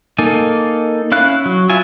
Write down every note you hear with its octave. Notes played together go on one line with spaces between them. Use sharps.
A#3 D#4 A4 G#5
C#4 E4 F5 F#6
F#3
E4 F4 E5 G#5